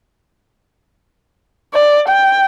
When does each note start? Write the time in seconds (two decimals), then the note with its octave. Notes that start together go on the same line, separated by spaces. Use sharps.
1.74 D5
2.09 G5